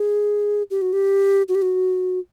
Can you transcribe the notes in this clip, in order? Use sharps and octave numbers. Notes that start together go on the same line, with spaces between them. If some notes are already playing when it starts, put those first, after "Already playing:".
Already playing: G#4
G4
F#4
G4
F#4
G4
F#4